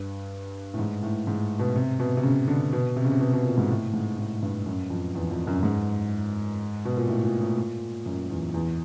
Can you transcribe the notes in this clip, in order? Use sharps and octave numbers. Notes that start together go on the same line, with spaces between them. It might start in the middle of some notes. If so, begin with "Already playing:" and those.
Already playing: G2
A2
G#2
A2
G#2
B2
C3
B2
C3
C#3
D3
B2
C3
C#3
C3
B2
B2
A#2
G#2
A2
G#2
A2
G2
F#2
F2
E2
F2
F#2
G#2
B2
A#2
A2
A#2
A2
A#2
F#2
E2
E2